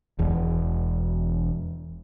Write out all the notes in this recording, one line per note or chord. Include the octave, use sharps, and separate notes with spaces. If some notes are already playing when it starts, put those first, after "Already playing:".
E1 E2